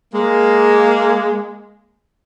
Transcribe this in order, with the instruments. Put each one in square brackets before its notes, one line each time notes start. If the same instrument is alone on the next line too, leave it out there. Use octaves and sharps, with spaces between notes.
[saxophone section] G#3 A#3